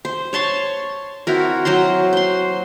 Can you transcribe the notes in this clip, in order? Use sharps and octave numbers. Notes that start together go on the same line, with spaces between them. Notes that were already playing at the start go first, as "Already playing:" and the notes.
C5
C#5 A5 C6 C#6
C4 E4 F#4 A#4
F#3 C5 A#5 C6
C5 C6